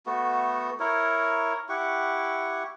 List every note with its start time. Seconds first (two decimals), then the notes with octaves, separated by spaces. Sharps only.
0.06 A3 B3 F#4
0.80 E4 A#4 C#5
1.69 E4 G4 F#5 C#6